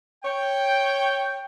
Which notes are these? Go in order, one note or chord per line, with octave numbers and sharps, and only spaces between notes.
C#5 G5